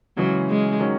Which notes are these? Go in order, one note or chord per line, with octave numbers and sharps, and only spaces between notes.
C#3 E3 F#3 G#3 C#4
G#3
D#3 F#3 C#4 F#4 C#5